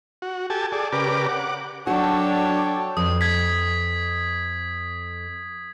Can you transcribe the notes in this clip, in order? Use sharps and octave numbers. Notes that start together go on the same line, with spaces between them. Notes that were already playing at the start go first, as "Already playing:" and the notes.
F#4
G4 A4 G#5 A5
G#4 A4 D5
C#3 G4 A#4 B4 D5 D6
F#5 D6
F#3 D4 F#4 A4 C#5 G5
F2 B4 D#6
G#6 B6